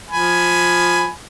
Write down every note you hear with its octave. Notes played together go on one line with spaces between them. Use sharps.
F3 G#5 B5